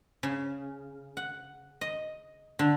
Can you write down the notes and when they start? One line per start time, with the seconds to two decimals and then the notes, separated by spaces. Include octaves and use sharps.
0.23 C#3
1.17 F#5
1.81 D#5
2.59 D3